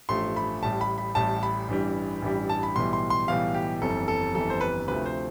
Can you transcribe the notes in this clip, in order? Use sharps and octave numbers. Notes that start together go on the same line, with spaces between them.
A1 G2 F3 A3 C6
B5
A1 A2 G3 A5
B5
B5
A1 A2 G3 A5
B5
A1 G2 E3 G3
A1 G2 E3 G3
A5
B5
B1 A2 E3 G3 C6
C6
C6
B1 A2 E3 G3 F5
G4
G1 F2 E3 G3 A4
A4
G1 F2 E3 G3 A4
C5
B4
D2 C3 F3 A3 B4
C5